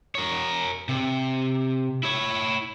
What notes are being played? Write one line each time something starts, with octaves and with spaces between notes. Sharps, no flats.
A#4 C#5
C3
E4 C#5